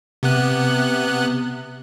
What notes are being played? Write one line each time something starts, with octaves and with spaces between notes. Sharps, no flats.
C3 B3 F#6